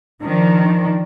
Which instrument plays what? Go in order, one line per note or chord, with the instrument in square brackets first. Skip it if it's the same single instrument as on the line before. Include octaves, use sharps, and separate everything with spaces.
[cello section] D#3 F3 D4